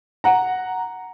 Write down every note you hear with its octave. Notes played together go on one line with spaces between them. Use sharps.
F#5 A#5